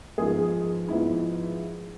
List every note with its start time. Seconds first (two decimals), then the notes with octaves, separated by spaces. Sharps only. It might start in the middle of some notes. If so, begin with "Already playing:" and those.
0.18 G#2 F3 B3 G#4
0.88 G#2 F3 B3 E4